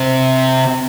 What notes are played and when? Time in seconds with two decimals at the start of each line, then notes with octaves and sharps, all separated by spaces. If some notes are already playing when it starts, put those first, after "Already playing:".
Already playing: C3